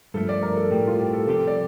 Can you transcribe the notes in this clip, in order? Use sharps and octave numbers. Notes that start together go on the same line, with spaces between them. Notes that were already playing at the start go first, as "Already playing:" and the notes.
G2 F3 A3 A4
D5
A#4
A4
A2 G3 C4 G4
F4
G4
A4
F2 C3 G3 C4 G4 A4
D5